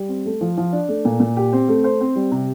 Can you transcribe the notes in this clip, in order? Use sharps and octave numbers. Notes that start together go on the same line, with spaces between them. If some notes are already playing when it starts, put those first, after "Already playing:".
Already playing: G3
C4
A3
F3
F3
D4
A3
A#2
A#2
G4
C4
A3
C5
C4
G3
C3